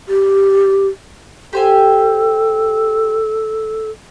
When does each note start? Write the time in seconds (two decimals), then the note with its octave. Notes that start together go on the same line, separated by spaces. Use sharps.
0.08 G4
1.53 G4 A4 C5 G#5